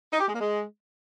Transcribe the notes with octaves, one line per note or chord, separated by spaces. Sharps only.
D#4
G4
G#3
A#3
G#3